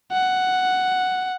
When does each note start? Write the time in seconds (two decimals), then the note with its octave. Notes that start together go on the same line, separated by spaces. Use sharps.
0.12 F#5